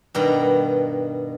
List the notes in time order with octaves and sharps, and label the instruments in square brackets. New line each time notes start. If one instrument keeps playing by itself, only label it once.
[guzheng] G2 B2 D#3 G5 A#5